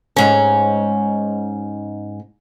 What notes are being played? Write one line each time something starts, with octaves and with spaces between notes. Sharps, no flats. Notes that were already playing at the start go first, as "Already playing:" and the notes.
G#2 C#4